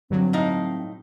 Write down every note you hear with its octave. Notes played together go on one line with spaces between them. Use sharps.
G2 D3 F#3 C4
A2 D#4 F5